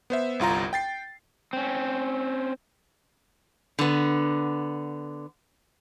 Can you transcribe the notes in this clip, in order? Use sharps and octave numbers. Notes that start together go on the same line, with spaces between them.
B3 C5 E5
G1 C2 F4 A#5
G5 A6 C7
C4 C#4
D3 B3